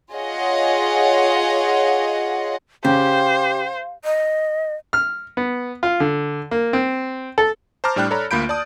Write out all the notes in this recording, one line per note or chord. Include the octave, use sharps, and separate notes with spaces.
F4 G#4 C#5 D#5 F#5
C#3 G4 C5 F5
D#5
F6
B3
F4
D3
A#3
C4
A4
C5 A5 A#5 D6 F6
A2 G3 D4 G5 F#6
A4 C#5 D5 A#5 B5
D2 A#3 F4 B5 G6 D7
D5 A5 D#6